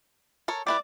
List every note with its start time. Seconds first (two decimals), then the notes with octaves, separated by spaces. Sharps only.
0.48 A4 A#4 C#5
0.67 G3 E4 B4 D5 D6